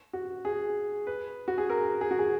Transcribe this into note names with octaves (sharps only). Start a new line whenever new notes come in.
F#4
G#4
B4
F#4
G#4
A#4
G#4
F#4
G#4